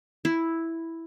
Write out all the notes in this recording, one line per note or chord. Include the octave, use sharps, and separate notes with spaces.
E4